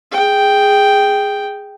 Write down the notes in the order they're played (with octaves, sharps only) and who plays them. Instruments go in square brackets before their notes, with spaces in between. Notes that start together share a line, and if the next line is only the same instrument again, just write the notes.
[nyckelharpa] G#4 G5